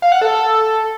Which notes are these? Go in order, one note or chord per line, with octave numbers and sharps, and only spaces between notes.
F5
F#5
A4